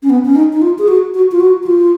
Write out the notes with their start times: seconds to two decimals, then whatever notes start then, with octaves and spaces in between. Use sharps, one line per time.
0.03 C#4
0.10 B3
0.25 C#4
0.36 D#4
0.53 D#4
0.62 F4
0.79 G#4
0.88 F#4
1.14 F#4
1.32 F4
1.40 F#4
1.63 F#4
1.66 F4